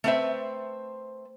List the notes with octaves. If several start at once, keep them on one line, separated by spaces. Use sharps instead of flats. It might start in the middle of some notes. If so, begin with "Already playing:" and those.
A3 C4 B4 C5 E5